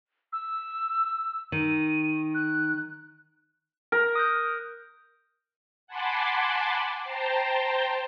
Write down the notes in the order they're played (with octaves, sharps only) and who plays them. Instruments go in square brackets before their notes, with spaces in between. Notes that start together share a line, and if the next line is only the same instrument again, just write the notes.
[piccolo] E6
[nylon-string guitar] D#3 [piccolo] D#7
[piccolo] F#6
[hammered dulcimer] A#4
[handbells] D#6 F#6 G6
[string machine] F#5 G#5 A5 B5 C6 D6
C5 G5 A5 A#5 C6